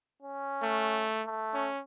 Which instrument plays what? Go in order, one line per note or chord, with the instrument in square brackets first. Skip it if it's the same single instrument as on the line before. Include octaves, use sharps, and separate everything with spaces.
[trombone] C#4
[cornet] A3
[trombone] A3
[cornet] C#4